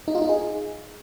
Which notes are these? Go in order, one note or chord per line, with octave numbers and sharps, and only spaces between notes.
D#4
F4
D#4
G#4